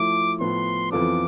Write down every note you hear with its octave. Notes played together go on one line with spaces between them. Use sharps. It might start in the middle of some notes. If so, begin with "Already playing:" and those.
Already playing: F3 A3 E4 D6
A2 F3 B3 C6
F2 E3 B3 F4 A4 D6